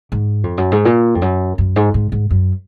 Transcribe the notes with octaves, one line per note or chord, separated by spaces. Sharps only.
G#2
F2
F#2
G#2
A#2
F2
F#2
F#2
G#2
G#2
G#2
F#2